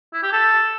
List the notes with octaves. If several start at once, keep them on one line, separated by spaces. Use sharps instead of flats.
E4
G4
A4